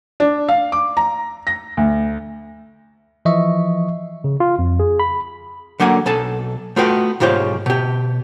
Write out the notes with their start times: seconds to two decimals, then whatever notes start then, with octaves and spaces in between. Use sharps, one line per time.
0.20 D4
0.49 F5
0.72 D6
0.97 A#5
1.47 A#6
1.77 D2
3.25 E3 F3 D#5 E5 C#6
4.24 C#3
4.40 F4
4.59 F2
4.80 G#4
5.00 B5
5.80 D3 F#3 A#3 F#5 G#5
6.06 B1 A4 G#5 A5
6.76 A3 B3 F4 F#4 B4 G5
7.20 B1 G#2 F4 G4 C5 C#5
7.66 B2 G4